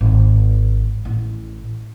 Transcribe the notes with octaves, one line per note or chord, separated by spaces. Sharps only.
G#1
A1